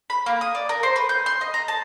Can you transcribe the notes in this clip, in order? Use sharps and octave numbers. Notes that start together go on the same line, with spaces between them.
B5
A#3
D#6
D5
A#4
C5
B4
G6
C6
D#5
A#5
A5